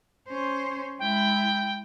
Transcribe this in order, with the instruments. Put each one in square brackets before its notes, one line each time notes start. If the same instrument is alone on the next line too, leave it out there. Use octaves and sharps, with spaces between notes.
[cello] C#4 C5
[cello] G#3 E4 [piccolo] G5